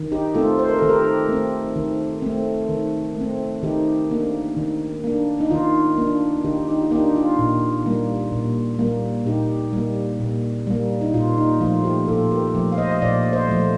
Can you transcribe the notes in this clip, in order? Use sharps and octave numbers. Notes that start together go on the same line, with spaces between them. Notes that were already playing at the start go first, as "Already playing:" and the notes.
Already playing: D#3
D#4 G4
A3 C4 F4 A4
C5
A#4
D#3 A4
G4 A#4
A3 C4
D#3
A3 C4
D#3
A3 C4
D#3 D#4 G4
A#3 D4
D#3
A#3 D4
D#4
D#3 F4
A#3 D4
D#3 D#4 G4
D#4 G4
F4
A#3 D4 D#4 G4
F4
A#2
G3 A#3
A#2
G3 A#3
A#2 D#4 G4
G3 A#3
A#2
G3 A#3
D#4
A#2 F4
D#4
F3 A3 F4
D#4 G4
A#2 F4 A4
G4 A#4
F3 A3
F5
C5 D#5
D#5
A#2 D5 F5
C5 D#5
F3 A3